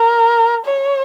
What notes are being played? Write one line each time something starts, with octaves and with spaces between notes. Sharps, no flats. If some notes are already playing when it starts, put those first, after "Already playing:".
Already playing: A#4
C#5